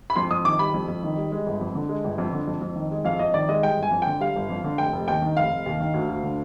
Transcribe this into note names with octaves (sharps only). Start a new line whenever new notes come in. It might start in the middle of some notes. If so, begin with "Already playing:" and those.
B5
F2 C6
F2 D#6
D#3 D6
G3 B5
F2
F2
D#3
G3
G#3
G1
F2
D3
G#3
G1
F2
D3
F2
F2
D#3
G#3
F2 F5
F2 D#5
D#3 D5
G#3 D#5
G3 G5
G1
G#5
F2
G5
D3
G3 F5
G1
F2
D3
F1 G5
F1
D#2 G5
D#3
F1 F5
F1
D#2
D#3
D2
D2
D3